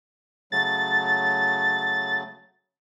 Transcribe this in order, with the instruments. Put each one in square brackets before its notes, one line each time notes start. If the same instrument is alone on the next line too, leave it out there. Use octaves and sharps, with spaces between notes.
[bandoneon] C#3 F#3 A3 [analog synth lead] A6